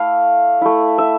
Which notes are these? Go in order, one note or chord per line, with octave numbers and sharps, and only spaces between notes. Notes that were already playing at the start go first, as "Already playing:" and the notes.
Already playing: A3 E4 F5
A3 E4
E5